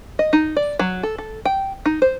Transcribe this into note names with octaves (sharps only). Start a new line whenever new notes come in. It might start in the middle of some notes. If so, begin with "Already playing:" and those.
D#5
D#4
D5
F#3
A4
A4
G5
D#4
C5